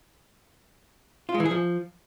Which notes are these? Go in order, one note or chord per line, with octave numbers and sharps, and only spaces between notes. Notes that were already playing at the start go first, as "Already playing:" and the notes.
F4
G#3
E3
G#4
F3